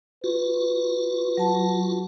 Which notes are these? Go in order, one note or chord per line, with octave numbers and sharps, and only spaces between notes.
F4 F#4 B4
F#3 A5